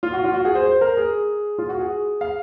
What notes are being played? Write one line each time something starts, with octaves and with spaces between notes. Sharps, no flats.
F4
F#4
F4
F#4
G#4
C5
C5
A#4
G#4
F4
F#4
G#4
F5